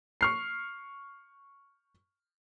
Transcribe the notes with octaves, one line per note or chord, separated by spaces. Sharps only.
C#6 F6 C7